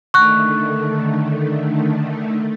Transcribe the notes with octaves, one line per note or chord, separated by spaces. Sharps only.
D3 D#3 A3 C#6 F#6